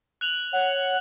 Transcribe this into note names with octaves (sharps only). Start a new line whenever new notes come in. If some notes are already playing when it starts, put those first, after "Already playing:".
F#6 F7 F#7
C#5 F#5